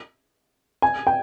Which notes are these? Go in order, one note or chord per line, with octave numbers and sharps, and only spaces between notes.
G#5
G5